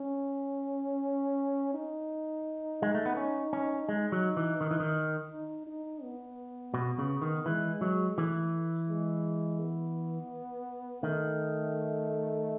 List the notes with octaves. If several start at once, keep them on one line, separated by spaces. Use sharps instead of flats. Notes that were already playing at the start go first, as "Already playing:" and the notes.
Already playing: C#4
D#4
G#3
A3
B3
C#4
C#4
G#3 D#4
F#3
E3
D#3
E3
D#3
D#4
D#4
B3
B2
C#3
D#3
E3 G#3
F#3
E3 A3
G#3
B3
D#3 A3